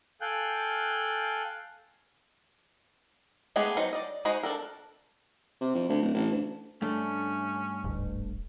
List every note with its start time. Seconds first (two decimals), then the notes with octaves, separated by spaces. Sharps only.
0.21 A4 F5 G5 G#5 F#6 G6
3.56 G#3 A3 B3 G4 G#4
3.77 F#3 D#4 C5
3.93 D5 D#5
4.25 G#3 D#4 F#4 C5 D#5
4.43 D4 A4 A#4
5.61 C3
5.75 F2
5.89 D2
6.02 D1
6.14 A1
6.32 D2
6.82 G2 A3 C#4 D4
7.84 D1 G#1